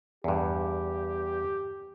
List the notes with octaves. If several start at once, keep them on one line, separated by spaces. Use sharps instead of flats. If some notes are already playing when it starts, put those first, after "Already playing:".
E2 G2 G4